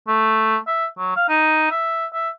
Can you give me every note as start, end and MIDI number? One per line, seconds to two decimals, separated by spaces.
0.08 0.57 57
0.67 0.86 76
0.98 1.15 54
1.16 1.29 77
1.29 1.66 63
1.71 2.06 76
2.13 2.29 76